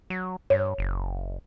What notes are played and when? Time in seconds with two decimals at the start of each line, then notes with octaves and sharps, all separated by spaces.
0.10 F#3
0.50 G2 C#5
0.78 F#1